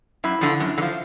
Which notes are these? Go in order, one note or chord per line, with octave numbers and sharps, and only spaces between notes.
F#2 E4
D3 F3
F#2
D3
F3